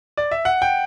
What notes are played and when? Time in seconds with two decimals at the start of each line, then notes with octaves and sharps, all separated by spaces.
0.17 D5
0.31 E5
0.45 F#5
0.62 G5